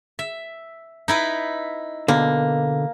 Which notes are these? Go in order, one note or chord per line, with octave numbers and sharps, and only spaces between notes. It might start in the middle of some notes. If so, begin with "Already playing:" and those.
E5
D#4 E4 B4
B2 D3 A#3